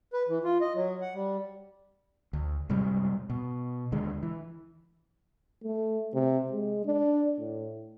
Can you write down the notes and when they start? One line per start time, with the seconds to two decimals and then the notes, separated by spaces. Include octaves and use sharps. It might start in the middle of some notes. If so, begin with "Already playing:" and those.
0.13 B4
0.28 E3
0.44 F4
0.61 D#5
0.75 F#3
1.01 F#5
1.14 G3
2.33 D2
2.69 F#2 C3 G3 G#3
3.30 B2
3.92 D#2 D3 G#3
4.23 E3
5.64 A3
6.14 C3
6.52 G#3
6.85 D4
7.39 A2